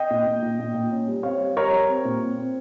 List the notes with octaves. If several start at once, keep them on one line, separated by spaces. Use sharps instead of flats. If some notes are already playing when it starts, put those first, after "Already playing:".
Already playing: D#5 G5
A#2
A#2
A#2
A#2
A#2
C#4
G3
C4 C#5 F5
G3
G3 A#4 C#5
G3
C4
A#2
C4
C4